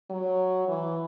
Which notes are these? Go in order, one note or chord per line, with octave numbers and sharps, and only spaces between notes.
F#3
E3